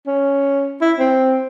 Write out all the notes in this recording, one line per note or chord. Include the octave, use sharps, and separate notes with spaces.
C#4
E4
C4